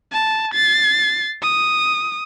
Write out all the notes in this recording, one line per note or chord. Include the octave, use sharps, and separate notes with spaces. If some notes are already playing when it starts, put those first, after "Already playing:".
A5
A6 C7
D#6